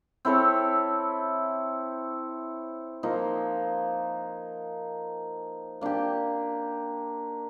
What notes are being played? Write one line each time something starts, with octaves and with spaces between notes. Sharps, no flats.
C4 E4 A4 C#5
F3 A#3 D#4
A#3 D4 G4